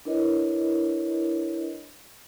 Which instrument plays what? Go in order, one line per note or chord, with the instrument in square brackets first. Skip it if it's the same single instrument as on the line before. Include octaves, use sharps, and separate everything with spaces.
[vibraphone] D4 E4 A#4 B4 C#5 D#5